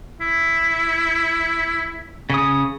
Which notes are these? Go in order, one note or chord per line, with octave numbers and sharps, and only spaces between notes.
E4
C#3 D#6